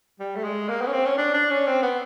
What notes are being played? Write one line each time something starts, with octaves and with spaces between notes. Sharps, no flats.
G3
A3
G#3
A#3
B3
C#4
C4
C#4
D4
D4
C#4
C4
B3